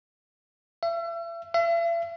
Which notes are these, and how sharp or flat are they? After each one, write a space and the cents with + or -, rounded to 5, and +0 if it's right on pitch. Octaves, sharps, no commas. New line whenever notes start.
E5 +40
E5 +45